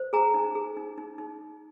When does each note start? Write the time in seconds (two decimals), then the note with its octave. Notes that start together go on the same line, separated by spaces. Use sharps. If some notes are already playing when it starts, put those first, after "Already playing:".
Already playing: C5
0.13 G#4 G#5 A#5
0.34 D#4
0.55 G#4
0.77 D#4
0.98 D#4
1.18 D#4